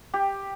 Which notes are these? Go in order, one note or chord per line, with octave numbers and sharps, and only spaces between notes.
G4